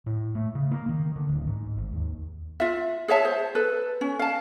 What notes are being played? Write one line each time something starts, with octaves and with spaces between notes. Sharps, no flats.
A2
A3
C#3
A#3
D#3
D3
D1
G#2
G#1
D#2
F4 E5
G#4 C#5 E5 A5
C5
A4 B4
C#4
F5 A5